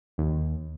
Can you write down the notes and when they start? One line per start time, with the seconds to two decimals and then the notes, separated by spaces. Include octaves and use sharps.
0.18 D#2